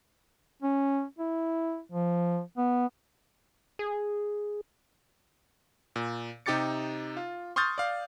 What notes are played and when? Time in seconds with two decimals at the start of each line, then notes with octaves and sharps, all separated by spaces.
0.62 C#4
1.18 E4
1.92 F3
2.57 B3
3.79 G#4
5.96 A#2
6.46 C3 D#4 G4 D6 A6 C#7
7.17 F4
7.56 C6 C#6 D#6 F6 G6 A6
7.78 D5 F5